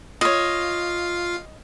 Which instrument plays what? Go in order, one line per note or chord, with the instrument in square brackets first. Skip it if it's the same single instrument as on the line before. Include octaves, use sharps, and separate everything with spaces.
[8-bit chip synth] F4 F5 [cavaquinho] C#5 D#5